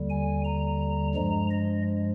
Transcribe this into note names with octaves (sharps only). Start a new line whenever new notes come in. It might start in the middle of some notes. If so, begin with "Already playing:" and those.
Already playing: D#2 D3 G3
G#5
A#5
G2 F3 G#3 A#5
D#5